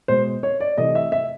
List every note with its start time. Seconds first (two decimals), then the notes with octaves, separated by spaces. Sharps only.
0.08 B2 G#3 C5
0.43 C#5
0.60 D5
0.78 C3 E3 A3 D#5
0.95 E5
1.12 E5